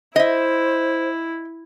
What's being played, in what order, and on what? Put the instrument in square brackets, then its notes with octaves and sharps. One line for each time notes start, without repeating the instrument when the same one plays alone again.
[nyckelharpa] E4 [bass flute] C5 [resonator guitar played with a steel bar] D#5 E5